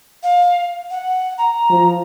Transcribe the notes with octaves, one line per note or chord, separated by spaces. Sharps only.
F5
F#5
A#5
F3